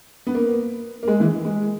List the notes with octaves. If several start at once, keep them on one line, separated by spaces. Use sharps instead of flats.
B3
A#3
A#3
G#3
E3
G#3